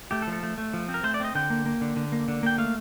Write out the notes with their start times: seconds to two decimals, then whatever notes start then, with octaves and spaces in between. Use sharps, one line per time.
0.11 A3 G4
0.22 A4
0.27 F3
0.33 A4
0.43 A3
0.58 A3
0.74 F3
0.89 C4
0.94 A#4
1.04 A3 C5
1.14 D5
1.20 C4 D#5
1.35 D3 G5
1.50 A#3
1.66 A#3
1.81 D3
1.96 D3
2.12 A#3
2.28 D3
2.43 A#3 G5
2.58 A3 F5